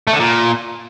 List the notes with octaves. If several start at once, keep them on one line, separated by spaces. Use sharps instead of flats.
A3
D3
A#2